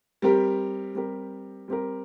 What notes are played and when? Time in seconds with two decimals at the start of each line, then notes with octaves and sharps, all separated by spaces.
0.22 G3 C4 G4 A#4
0.95 G3 C4 G4 A#4
1.68 G3 C4 G4 A#4